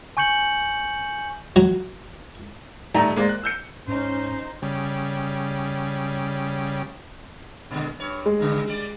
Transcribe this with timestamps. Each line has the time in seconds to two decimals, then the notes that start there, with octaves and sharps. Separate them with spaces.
0.17 G#5 C#6 G6 C#7 F#7
1.56 F#3
2.95 D#1 G3 A3 D#4 A#5
3.16 G#3 A#3 C5 D5
3.29 F#6
3.43 E6 G6 C#7
3.87 G#2 C#4 D#4 C5
4.62 C#3 G3
7.71 A#2 D3 G#3
7.99 G2 C#5
8.26 G#3
8.39 G2 C#3
8.66 G3 D5